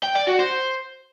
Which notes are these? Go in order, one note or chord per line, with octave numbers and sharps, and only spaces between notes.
G5
D5
F#4
C5